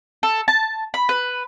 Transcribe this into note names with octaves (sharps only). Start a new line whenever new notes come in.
A4
A5
B5
B4